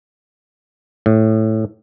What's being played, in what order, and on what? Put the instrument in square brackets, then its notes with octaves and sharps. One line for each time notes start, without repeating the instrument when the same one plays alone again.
[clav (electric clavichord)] A2